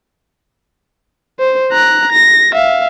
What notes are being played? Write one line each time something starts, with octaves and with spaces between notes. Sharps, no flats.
C5
A#5 F#6
A#6
E5 F5